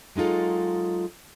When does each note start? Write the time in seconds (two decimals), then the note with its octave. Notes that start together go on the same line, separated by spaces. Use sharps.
0.16 F#3 G#3 D#4 F4 A4